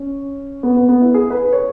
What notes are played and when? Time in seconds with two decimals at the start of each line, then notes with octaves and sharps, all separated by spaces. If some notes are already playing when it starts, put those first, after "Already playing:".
Already playing: C#4
0.63 B3
0.77 B3
0.89 B3
1.01 E4
1.14 G#4
1.30 B4
1.53 C#5